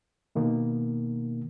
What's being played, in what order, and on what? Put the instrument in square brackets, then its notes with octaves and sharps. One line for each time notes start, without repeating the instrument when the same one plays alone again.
[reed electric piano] B2 D#3 A#3